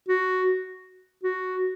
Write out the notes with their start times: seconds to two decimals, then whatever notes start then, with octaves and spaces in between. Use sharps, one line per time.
0.08 F#4
1.23 F#4